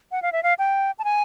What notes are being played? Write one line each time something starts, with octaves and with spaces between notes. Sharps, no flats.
F#5
F5
E5
F5
G5
A5
G#5